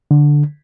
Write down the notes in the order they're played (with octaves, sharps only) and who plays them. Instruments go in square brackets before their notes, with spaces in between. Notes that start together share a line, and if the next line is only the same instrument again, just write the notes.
[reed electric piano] D3